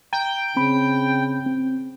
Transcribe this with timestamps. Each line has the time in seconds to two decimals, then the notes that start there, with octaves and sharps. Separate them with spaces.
0.13 G5 A#5
0.57 C#3 C4 B5
1.46 C4